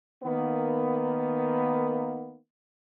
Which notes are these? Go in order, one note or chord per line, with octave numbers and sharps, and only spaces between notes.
D#3 A#3 B3